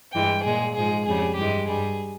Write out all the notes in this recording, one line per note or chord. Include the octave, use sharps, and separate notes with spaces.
G2 E3 G#3 G5
A#2 G#3 G#4
G#2 F3 G#3 G#4
F2 C#3 G3 G#4
G2 E3 G#3 G4
G2 G3 G#4